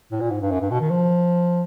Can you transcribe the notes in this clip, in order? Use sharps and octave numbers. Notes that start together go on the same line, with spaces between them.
A2
A#2
G#2
G2
F#2
G2
B2
D#3
F3